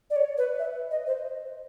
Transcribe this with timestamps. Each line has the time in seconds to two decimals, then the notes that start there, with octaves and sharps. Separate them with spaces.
0.10 D5
0.16 C#5
0.38 B4
0.59 E5
0.91 D#5
1.07 C5